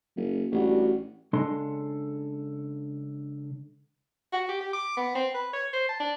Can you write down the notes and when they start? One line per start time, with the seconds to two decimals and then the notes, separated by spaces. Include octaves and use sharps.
0.16 F#1
0.52 A1 G3 D4 F#4
1.33 C#3 G#3 D4 A4 C6
4.32 F#4
4.49 G4
4.61 G4
4.73 D6
4.97 B3
5.15 C4
5.34 B4
5.53 C#5
5.73 C5
5.89 A5
6.00 D4